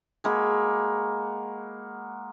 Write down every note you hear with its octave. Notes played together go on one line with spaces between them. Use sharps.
G#3 A#3 F#4 B5